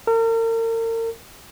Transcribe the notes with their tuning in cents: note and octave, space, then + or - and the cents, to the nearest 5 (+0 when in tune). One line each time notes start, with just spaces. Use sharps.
A#4 -40